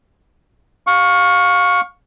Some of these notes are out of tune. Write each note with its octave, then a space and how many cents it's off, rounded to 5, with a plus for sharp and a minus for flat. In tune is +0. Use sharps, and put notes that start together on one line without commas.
F5 +25 C#6 +0